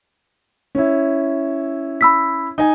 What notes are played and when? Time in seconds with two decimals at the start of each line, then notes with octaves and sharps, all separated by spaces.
0.75 C#4 E4
2.01 B5 E6 B6
2.58 D#4 G#5